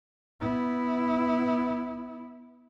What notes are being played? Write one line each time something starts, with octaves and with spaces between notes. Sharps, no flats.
B3 E4